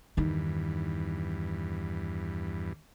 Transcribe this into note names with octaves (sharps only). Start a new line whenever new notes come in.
E2 G2 D#3 D#4